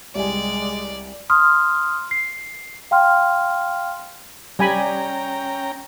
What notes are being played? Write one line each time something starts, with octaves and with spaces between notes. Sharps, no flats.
C2 G3 G#3 D5 G#5
C6 D#6 F6
C7
F5 G5 C6 F6
G3 C#4 G5 G#5 A#5 B5